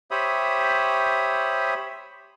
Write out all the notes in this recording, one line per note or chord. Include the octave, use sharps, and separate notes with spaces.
G4 C5 C#5 E5 B5 D#6